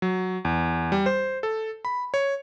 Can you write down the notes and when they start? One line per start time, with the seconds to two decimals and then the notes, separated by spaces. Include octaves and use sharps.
0.02 F#3
0.45 E2
0.92 G3
1.06 C5
1.43 A4
1.85 B5
2.14 C#5